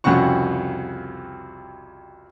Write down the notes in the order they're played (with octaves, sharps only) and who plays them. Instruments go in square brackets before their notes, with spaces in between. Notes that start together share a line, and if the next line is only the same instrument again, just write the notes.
[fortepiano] C2 F2 C#3 F#4 F#5 C#6